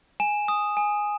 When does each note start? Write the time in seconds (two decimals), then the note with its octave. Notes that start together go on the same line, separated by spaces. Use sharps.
0.20 G#5 E7
0.48 D#6
0.77 G#5